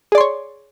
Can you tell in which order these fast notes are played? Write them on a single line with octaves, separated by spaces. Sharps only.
G#4 D5 C6 C#5